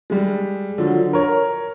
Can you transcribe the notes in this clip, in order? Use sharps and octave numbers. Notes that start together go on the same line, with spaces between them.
G3 G#3
D3 F3 F#3
A#4 C#5